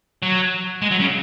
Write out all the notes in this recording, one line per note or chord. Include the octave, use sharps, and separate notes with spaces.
F#3
G#3
F#3
C#3